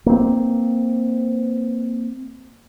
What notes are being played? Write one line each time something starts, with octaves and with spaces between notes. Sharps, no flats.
A#3 C4